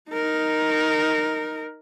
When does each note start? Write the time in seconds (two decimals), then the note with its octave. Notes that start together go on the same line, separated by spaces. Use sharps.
0.11 D#4 A#4